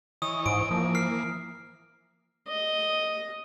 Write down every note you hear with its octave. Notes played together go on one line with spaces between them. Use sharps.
E3 C#5 D#5 D#6
G#2 D7
E3 F3 A#3
F6 C7
D#5